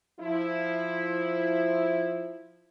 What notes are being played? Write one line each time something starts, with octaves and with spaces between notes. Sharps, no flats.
F3 E4